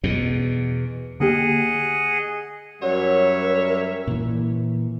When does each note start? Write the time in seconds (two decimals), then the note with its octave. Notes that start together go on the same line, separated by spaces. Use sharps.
0.04 E2 B2
1.20 D3 A#3 G4 G#4 D#5 F#5
2.82 F#2 F#3 G3 A#4 C#5 E5
4.07 A#2 E3